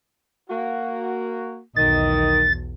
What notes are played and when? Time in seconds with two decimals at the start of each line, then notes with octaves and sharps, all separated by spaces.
0.50 A#3 F#4
1.76 B1 E2 D#3 D#5 A6